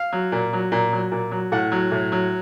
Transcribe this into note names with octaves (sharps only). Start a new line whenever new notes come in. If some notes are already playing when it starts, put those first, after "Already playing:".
Already playing: F5
F#3
A#2
F#3
A#2
F#3
A#2
F#3
A2 F#5
F#3
A2
F#3